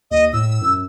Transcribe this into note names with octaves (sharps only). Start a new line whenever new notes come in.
D#2 D#5
A2 E6
F#2